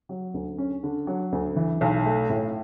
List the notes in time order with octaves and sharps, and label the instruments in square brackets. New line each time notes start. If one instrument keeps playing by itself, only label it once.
[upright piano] F#3
D2
C#4
D3
F#3
D2
E3
B1
A3
A2